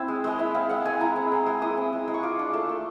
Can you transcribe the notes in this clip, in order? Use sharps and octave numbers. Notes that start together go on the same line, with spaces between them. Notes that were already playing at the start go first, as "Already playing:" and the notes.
Already playing: C4 E4
G#3
G#3 D#5
E4 E5
C4 F5
G#3 F#5
G#3 G#5
E4 A#5
C4
G#3
G#3
E4 D#6
C4
G#3
G#3
C#6
F4 D6
D4
A3
A3